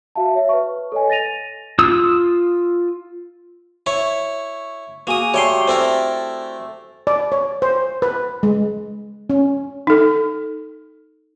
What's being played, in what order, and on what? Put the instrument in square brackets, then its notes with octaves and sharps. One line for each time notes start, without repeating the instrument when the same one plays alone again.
[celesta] F#4 E5 F5 A5
C#5 E5
B4 C#6
A4 C#5 D#5 G#5
A6 A#6 D#7 F7
[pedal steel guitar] F4 D#6 E6
[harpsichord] E4 C#5 [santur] C#6
[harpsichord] A#3 D#6 [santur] F#4 G#4 G#5
[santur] G3 A3 [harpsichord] C#5 G5 C6
[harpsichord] C4 E4 A#4 [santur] A4 D5
[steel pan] D5
C#5
C5
B4
G#3
C#4
[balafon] D#4 A4